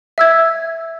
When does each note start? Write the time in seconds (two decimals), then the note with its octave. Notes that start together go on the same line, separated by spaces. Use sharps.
0.18 E5 E6 G#6